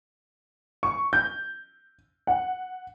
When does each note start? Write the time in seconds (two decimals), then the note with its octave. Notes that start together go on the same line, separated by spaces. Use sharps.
0.83 C#6
1.13 G6
2.27 F#5